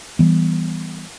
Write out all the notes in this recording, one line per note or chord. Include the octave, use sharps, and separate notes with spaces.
E3 G3 B3